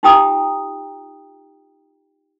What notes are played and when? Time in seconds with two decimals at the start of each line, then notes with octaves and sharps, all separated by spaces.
0.03 D#4 F4 G4 G5 A#5 D#6